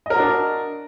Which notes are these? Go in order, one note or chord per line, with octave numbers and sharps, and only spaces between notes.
D4 F#4 A#4 D#5